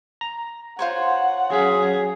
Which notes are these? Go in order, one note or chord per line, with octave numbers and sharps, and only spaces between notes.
A#5
F4 C5 C#5 F#5
F#3 C#4 G#4 B6